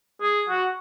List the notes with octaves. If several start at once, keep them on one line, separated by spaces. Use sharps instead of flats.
G#4
F#4